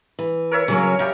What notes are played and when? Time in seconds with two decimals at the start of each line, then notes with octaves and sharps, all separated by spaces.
0.19 E3
0.51 A#4 C#5 E5
0.68 C#3 F#3 A#3 C#4 C#5
0.99 G3 E5 F5 G5 A#5